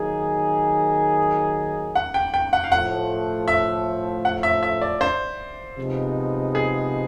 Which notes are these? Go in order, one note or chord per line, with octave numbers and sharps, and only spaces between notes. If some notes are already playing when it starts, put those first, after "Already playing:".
Already playing: D#3 F#3 A#3 D#4 G#4
F#5
G5
G5
F#5
F5
A2 F3 A3 F#5
E5
F#5
E5
E5
D5
C5
C3 F3 G#3 B3 D#4
G#4